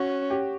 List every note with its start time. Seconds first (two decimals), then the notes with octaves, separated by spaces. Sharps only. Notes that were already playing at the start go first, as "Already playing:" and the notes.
Already playing: C#4 F#4
0.30 G4